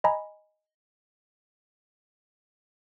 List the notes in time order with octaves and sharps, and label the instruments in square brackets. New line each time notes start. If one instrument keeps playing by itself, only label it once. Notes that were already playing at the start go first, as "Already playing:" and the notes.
[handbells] D#5 G#5 A#5 B5